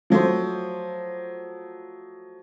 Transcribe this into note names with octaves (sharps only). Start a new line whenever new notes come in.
F3 F#3 A3 C5